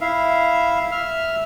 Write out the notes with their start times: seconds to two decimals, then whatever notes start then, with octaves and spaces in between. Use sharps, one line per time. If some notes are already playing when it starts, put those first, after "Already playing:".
0.01 E4 E5 F5
0.92 E5 F6